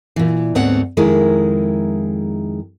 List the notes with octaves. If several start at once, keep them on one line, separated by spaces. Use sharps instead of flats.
A#2 E3
D2 G#2 B3 C4 C#5 F#5
F2 D#3 G#3 E4 G#4 A#4